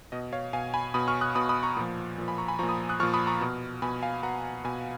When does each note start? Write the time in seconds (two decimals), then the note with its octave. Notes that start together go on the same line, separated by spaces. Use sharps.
0.12 B2 D#5
0.32 C#5 F5
0.53 B2 F5 G#5
0.74 G#5 B5
0.94 B2 B5 D#6
1.08 C#6 F6
1.21 D#6 F#6
1.35 B2 B5 D#6
1.49 B5 D#6
1.63 A#5 C#6
1.77 A#2 F3
2.18 A#2 F3
2.28 G#5 B5
2.38 A#5 C#6
2.48 G#5 B5
2.59 A#2 F3 A#5 C#6
2.69 B5 D#6
2.89 D#6 F#6
3.00 F3 C#6 F6
3.03 A#2
3.13 B5 D#6
3.27 A#5 C#6
3.41 B2
3.82 B2 G#5 B5
4.02 F5 G#5
4.23 B2 F#5 A#5
4.64 B2 G#5 B5